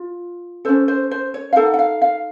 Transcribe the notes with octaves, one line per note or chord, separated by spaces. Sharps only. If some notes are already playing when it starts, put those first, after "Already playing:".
Already playing: F4
C#4 A4 C5
C5
C5
C#5
F5
D#4 A4 F#5
F#5
F5
F5